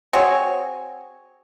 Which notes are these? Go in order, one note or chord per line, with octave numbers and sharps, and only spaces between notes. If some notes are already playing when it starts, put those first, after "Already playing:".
C4 F#4 G#4 C#5